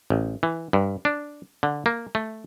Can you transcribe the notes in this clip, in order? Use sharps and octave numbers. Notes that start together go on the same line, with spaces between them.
A1
E3
G2
D4
D3
A#3
A3